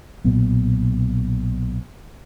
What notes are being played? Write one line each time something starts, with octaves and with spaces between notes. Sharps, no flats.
B1 A#2 B3